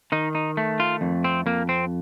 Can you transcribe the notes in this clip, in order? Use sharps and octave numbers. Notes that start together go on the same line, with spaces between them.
D#3 D#4
D#4
A3
F4
F2
C4
F2 A#3
C4